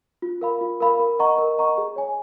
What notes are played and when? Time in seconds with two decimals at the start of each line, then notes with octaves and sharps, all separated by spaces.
0.22 F4
0.41 A#4 F5 B5
0.61 F4
0.80 A#4 F5 B5
0.99 A#4
1.19 D#5 F#5 A#5 C#6
1.38 A#4
1.58 D#5 F#5 A#5 C#6
1.78 G#4
1.96 C#5 G#5